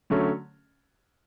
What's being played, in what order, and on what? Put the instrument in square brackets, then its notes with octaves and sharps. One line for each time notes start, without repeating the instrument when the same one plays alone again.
[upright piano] D3 F#3 A3 C#4